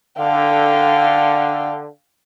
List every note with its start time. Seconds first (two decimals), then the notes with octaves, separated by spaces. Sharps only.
0.18 D3 F5 G5